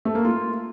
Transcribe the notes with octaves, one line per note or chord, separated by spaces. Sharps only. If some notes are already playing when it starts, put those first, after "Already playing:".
A3
A#3
F4